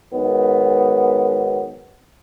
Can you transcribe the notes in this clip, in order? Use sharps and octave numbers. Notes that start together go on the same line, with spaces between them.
G#2 D#3 F#3 B3